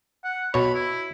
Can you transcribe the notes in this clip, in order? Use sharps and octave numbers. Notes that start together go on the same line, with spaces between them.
F#5
B2 C#5 B5
E4